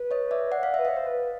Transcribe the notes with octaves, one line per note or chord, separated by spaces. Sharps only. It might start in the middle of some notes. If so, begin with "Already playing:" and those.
Already playing: B4
C#5 D#5
D5 E5
D5 F#5
C#5
D5 F5
B4 E5
C#5 D#5 F5
C5
B4